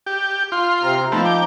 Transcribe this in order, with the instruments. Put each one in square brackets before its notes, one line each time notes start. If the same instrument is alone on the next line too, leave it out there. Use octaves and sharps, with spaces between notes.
[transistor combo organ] G4
F4 C6
[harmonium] C3 C4 A#5
[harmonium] F3 D#4 A#5 [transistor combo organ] A3 B3 C4
[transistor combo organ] G5 D6